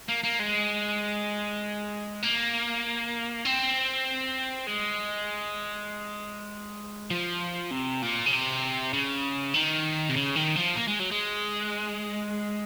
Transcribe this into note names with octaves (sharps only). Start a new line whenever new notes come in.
A#3
A#3
G#3
A#3
C4
G#3
F3
C3
A#2
C#3
C3
C#3
D#3
C3
C#3
D#3
F3
A#3
G#3
F#3
G#3